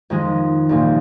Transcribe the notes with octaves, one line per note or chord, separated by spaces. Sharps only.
F2 D#3 G#3 D#4 G#4
C2 A#2 F3 A#3 D#4